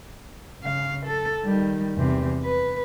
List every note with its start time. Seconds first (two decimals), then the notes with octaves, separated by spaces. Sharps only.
0.62 C#3 F5
1.05 A4
1.44 D#3 G3
1.96 E2 C3
2.44 B4